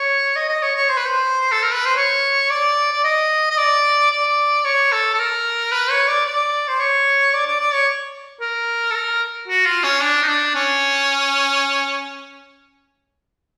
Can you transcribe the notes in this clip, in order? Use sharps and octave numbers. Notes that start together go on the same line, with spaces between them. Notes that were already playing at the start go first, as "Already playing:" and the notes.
Already playing: C#5
D#5
D#5
C#5
C#5
C5
B4
C5
A4
A#4
B4
C5
C#5
D5
D5
D#5
D#5
D5
D5
C#5
A4
A4
A#4
B4
C#5
D5
D5
C5
C#5
D5
D5
D5
C#5
A#4
A4
A#4
F#4
F4
C#4
D4
D#4
D4
C#4